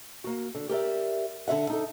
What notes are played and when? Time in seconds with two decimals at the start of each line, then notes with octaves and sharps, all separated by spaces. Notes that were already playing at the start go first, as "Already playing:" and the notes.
0.24 A#3 F#4
0.55 D3
0.69 G4 A#4 D5 E5
1.48 D3 F4 E5 F#5
1.70 D#4 A4